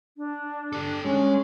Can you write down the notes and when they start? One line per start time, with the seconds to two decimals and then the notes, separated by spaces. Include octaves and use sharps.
0.17 D4
0.73 G4 A4
1.05 G#3 C#4